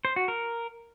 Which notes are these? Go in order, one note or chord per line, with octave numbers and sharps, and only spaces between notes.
C5
F#4
A#4